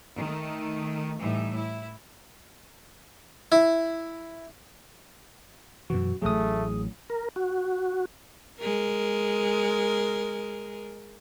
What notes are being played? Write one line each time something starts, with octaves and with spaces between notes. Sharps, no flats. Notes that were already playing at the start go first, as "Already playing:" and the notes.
D#3 A3
A2 E3 G3 D#4 E5
E4
E4
F#2 B2 E3 F#4
A1 F#3 A3 G#4 D#6
A#4
F#4
G#3 A#4